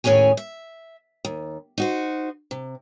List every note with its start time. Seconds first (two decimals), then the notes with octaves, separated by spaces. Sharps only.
0.04 D#2 A2 C#4 G#4 C#5 G#5
0.37 E5
1.25 D#2
1.78 D#4 F#4 C5
2.51 C3